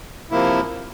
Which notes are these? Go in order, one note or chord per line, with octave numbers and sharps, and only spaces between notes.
C3 F3 A#3 E4